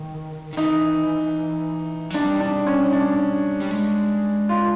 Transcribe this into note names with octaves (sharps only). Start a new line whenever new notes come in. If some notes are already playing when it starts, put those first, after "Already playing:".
Already playing: D#3
D#3
E3 D#4
F#3
G3 D4
D4
C#4
D4
G3
G#3
F4